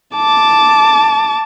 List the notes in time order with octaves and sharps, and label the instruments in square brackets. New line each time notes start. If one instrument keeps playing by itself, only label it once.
[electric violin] A5 D6